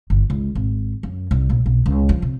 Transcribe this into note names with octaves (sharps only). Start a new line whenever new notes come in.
G1
C#2
G#1
F#2
C2
A#1
B1
C#2
F3
C3